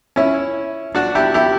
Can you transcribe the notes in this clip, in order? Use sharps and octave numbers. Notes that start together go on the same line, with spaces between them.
C#4 E4
D4 F#4
E4 G4
E4 G4